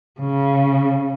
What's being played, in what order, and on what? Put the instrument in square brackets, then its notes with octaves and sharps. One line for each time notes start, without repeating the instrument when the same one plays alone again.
[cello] C#3